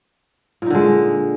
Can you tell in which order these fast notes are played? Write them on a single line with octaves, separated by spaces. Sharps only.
A#2 D#4 D3 G#3